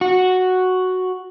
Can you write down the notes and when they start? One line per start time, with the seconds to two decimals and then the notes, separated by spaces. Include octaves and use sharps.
0.01 F#4